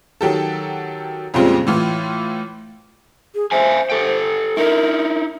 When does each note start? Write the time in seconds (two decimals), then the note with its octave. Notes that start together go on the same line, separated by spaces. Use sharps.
0.21 D#3 F#3 G4 A4
1.34 F2 A#2 C#3 G3 G#3 C4
1.67 A2 E3 F4
3.34 G#4
3.51 C5 E5 F5 G#5
3.90 G4 A4 G5
4.57 D#4 E4 A#4